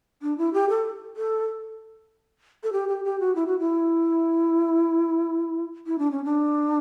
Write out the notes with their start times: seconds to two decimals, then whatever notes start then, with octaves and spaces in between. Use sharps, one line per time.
0.22 D4
0.38 E4
0.54 G4
0.69 A4
1.17 A4
2.63 A4
2.73 G4
2.89 G4
3.05 G4
3.20 F#4
3.35 E4
3.47 F#4
3.59 E4
5.87 E4
5.99 D4
6.11 C#4
6.25 D4